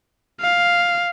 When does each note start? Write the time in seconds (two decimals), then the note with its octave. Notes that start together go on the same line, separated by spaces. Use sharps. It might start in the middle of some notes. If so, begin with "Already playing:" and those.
0.41 F5